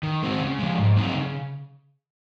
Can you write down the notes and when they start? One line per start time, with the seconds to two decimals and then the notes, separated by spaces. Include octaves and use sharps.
0.03 D#3
0.22 G#3 C4 F#4
0.41 C#3
0.59 F3 G#3
0.78 G#2
0.96 F#3 C4 D#4
1.15 C#3